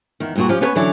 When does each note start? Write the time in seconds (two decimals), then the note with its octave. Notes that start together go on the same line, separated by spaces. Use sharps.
0.20 E2 D#3
0.36 G2 A#2 F#4
0.49 F3 C#4 F4 G4
0.61 B3 C#4 F#4 A#4 B4 C#5
0.75 D3 E3 F#3 C#4 E4 D5